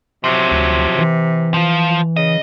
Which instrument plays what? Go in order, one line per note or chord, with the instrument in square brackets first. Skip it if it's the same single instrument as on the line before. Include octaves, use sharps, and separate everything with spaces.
[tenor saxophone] C3 [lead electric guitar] F3 F#3
[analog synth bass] D2
E3
[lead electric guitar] F3 F4
[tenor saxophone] C#3 [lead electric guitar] D#5